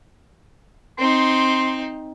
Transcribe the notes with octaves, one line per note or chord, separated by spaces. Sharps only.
C4 D#4 C6